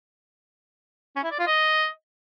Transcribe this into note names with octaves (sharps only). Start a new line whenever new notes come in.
C#4
E4
D5
F4
D#5